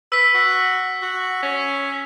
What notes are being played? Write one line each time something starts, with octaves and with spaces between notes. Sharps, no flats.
B4 E6 B6
F#4
F#4
C#4